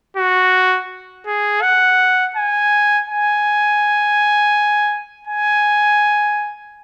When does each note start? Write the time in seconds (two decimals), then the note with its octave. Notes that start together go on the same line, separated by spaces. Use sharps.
0.17 F#4
1.26 G#4
1.62 F#5
2.36 G#5
3.09 G#5
5.27 G#5